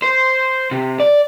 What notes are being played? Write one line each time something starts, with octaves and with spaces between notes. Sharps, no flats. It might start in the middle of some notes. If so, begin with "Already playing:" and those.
C5
C3
D5